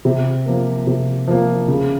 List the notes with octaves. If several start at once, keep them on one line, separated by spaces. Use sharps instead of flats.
C3
F3 A#3
C3
F3 A#3
C#3